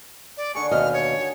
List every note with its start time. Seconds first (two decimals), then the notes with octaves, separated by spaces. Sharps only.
0.37 D5
0.55 D3 D#3 G#4 C#6
0.71 D#2 B2 D#5 F6
0.93 C#5
1.20 F#4